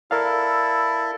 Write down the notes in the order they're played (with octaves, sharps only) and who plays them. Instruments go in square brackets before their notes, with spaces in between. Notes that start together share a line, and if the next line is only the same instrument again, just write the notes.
[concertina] E4 A4 [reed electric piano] A#4 D5 F5